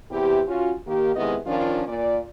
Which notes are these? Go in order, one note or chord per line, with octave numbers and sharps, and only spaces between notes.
E2 C3 E4 G4
C#4 F4 F#4
D#3 A#3 G4
C3 D#3 G#3 B3 E4 D#5
D#3 F3 C#4 D4 F4
A#2 D5